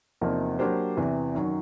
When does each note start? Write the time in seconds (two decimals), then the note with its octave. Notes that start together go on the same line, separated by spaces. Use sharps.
0.21 E2 C3 F3 A#3 D#4
0.59 F#3 A#3 D4 G4 C5
0.97 E2 C3 E3
1.35 F#2 D#3 F#3